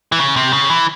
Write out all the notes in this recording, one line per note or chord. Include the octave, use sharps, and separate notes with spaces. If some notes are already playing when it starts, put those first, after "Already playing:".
E3
C#3
C3
C#3
E3